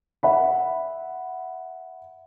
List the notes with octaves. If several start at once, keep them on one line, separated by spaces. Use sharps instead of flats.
E5 F#5 B5